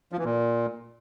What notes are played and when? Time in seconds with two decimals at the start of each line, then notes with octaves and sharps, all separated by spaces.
0.12 F3
0.18 E3
0.24 A#2